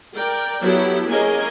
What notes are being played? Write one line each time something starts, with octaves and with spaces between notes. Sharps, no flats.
A#4 D5 G5
F#3 B3 E4 G4 A4
A#3 C#4 G#4 A#4 D#5 G#5